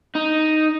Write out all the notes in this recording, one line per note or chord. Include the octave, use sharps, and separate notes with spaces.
D#4